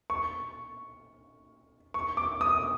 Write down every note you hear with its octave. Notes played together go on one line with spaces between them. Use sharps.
C#6
C#6
D6
D#6